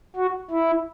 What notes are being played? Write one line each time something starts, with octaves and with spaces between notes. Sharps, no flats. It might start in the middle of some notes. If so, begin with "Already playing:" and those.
F#4
E4